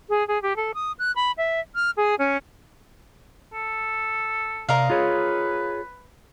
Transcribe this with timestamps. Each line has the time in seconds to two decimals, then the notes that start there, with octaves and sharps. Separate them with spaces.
0.09 G#4
0.28 G#4
0.42 G4
0.56 A4
0.74 D#6
0.99 F#6
1.16 B5
1.38 E5
1.75 F6
1.97 G#4
2.19 C#4
3.53 A4
4.69 C3 A#4 D5 D#5 F5
4.90 F4 G#4 B4 C#5